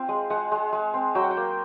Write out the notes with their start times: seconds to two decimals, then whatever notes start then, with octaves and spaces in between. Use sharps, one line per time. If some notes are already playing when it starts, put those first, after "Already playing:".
Already playing: C4 F4
0.09 G#3
0.30 G#3 F#5
0.52 G#3
0.73 G#3
0.94 C4
1.15 F#3 G5
1.24 F#5
1.31 G5
1.37 A#3